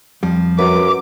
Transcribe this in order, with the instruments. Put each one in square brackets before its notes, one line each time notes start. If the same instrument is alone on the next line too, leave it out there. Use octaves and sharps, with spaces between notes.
[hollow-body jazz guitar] F2 G3 [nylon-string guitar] F3
[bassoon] F#2 [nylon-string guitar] B4 [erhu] D6